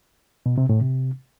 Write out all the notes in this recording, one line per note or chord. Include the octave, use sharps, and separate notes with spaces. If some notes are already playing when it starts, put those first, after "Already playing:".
B2
C3
A2
C3